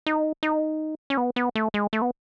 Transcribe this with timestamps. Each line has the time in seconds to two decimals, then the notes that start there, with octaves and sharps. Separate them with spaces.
0.06 D#4
0.43 D#4
1.10 C#4
1.17 B3
1.36 B3
1.55 A3
1.74 G#3
1.93 A3
2.02 B3